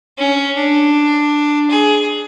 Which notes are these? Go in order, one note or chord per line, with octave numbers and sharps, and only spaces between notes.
C#4
D4
G#4